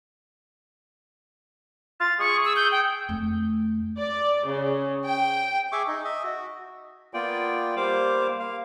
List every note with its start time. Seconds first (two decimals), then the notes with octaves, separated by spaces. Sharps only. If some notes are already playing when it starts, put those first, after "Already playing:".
2.00 F4 A6
2.19 G#4 C#6
2.45 E6
2.56 G6
2.72 G5
3.09 F2 A3
3.99 D5
4.47 C#3
5.05 G5
5.72 G#4 E5 C#6 D6
5.87 D#4
6.04 D#5 E5
6.24 F#4
7.14 A#3 B3 F4 D5 G5
7.76 G3 A#3 C5 F5 D6
8.39 A#3 F5